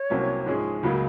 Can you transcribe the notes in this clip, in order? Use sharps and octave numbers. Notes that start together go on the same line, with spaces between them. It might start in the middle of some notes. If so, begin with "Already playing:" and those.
Already playing: C#5
C2 C3 F#3 A#3 C#4
G#2 F3 G#3 C#4 G#4
C#2 C#3 F#3 A#3